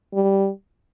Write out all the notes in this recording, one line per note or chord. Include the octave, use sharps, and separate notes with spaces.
G3